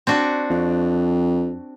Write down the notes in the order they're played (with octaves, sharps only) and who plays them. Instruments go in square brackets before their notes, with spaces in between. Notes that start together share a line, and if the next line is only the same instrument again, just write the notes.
[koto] C4 D4 F#4
[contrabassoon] F2